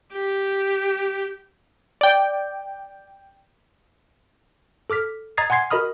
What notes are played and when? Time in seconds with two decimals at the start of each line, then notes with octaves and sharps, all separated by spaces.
0.13 G4
2.01 D5 G5
4.90 A4 D6 F6 B6
5.37 D#5 A#5 D#6 G#6 A6 C7
5.50 F#5 G#5 C6 G#6 C7
5.71 F#4 A#4 D#5 B5 D#6 F6